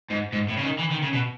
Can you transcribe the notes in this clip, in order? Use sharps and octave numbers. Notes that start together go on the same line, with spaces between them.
G#2
G#2
A2
C#3
D#3
E3
D#3
C#3
B2